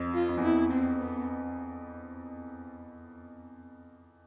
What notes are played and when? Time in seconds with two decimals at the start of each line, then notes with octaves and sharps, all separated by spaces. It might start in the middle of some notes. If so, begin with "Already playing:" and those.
Already playing: F2
0.15 F4
0.29 F2
0.37 E2
0.43 F2 E4
0.72 C4
1.01 B3